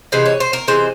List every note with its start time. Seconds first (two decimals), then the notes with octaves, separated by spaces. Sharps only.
0.12 C3 E3 G#3 C5
0.26 C#5
0.40 C5
0.53 A#4
0.68 C3 E3 G#3 C5